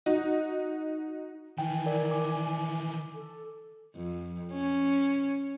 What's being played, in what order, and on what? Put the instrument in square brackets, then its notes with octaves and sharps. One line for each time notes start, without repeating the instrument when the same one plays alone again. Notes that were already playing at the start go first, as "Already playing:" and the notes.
[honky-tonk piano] D#4 F#4
[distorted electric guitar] D#3 E3 [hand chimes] G5 [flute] G#5
[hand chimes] A#4 D5
D6
[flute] A4
[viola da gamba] F2
C#4